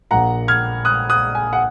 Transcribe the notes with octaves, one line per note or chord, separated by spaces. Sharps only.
A#1 A#2 F#5 A#5
F6 G#6
D#6 F#6
D#6 F#6
G#5
F#5